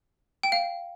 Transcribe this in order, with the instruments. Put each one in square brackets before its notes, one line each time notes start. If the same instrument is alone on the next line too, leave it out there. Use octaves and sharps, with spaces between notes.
[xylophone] G5
F5